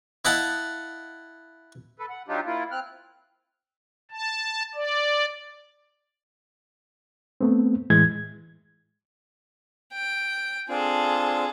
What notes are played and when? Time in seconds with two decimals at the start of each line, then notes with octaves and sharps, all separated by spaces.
0.25 E4 D#5 F5 F#5 A5
1.98 A4 B4
2.09 F#5
2.28 F#3 D4 D#4 F4 G4
2.46 A#3 E4 F4
2.71 C4 F6 F#6
4.11 A5
4.75 D5
7.41 A3 B3 C4
7.90 A2 E3 G#3 G#6
9.93 G5
10.69 C4 D4 F4 G#4 A4